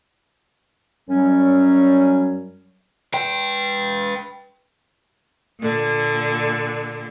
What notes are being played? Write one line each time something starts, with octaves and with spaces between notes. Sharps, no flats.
F#2 F#3 G3 C#4
B4 G5
A#2 D3